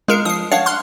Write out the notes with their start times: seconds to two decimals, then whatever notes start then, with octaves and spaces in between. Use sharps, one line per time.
0.08 G#3 F4 A#4 C#7
0.25 F3 D#6 C7
0.51 C#5 F5 F#5 A5 C7
0.66 C6 F6 F#6